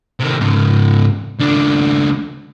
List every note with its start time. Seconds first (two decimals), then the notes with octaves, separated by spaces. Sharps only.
0.20 C3 D#3
0.40 G#2 C#3
1.39 C#2 D4